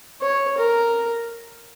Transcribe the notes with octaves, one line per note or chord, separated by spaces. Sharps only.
C#5
A#4